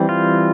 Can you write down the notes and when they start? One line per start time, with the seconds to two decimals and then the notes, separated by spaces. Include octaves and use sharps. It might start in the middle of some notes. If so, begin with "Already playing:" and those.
Already playing: E3 G3 C4
0.09 F4